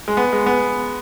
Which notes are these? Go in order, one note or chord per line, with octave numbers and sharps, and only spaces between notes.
G#3
B3
G#3
B3